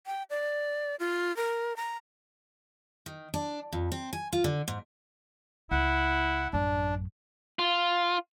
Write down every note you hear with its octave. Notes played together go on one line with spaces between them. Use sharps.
G5
D5
F4
A#4
A#5
D#3
D4
F2
C4
G#5
F4
D3
G#2
C#2 E4 F#5
A1 F#2 D4
F4